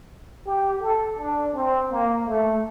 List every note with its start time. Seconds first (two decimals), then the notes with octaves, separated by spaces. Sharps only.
0.47 G4
0.82 A4
1.19 D4
1.55 C4
1.92 A#3
2.28 A3